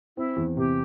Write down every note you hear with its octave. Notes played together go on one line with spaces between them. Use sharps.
C4 E4
E2
C3 G4